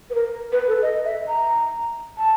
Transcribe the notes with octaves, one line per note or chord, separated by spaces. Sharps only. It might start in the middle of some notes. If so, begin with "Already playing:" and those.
B4
A#4
B4
A4
D#5
E5
A#5
A5